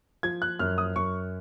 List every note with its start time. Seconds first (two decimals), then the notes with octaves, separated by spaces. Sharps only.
0.23 F3 G#6
0.42 F#6
0.59 F#2 F6
0.78 D#6
0.96 F#2 C#6